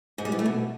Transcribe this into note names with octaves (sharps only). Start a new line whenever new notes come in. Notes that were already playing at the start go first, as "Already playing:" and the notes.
G#2
G3
E3
A3
B2